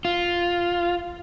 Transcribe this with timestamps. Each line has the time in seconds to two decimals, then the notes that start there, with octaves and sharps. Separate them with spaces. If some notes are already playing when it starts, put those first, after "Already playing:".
0.05 F4